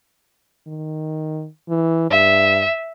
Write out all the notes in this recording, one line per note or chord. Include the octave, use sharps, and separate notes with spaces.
D#3
E3
G2 E5